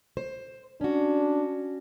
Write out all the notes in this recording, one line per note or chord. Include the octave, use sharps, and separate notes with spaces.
C5
C#4 D4 F#4